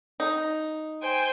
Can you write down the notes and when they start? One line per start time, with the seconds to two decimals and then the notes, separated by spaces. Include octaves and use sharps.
0.20 D#4
1.02 C5 G5 G#5